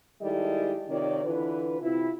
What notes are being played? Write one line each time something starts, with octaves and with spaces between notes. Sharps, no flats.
D#3 G3 G#3 E4 A4 D#5
C3 D#3 F4 C#5 D5
D3 E3 F4 B4
C3 E4 F4